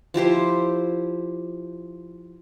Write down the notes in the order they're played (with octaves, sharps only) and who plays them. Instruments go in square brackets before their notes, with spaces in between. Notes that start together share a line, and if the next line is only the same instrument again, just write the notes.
[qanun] F3 E4 G4 C5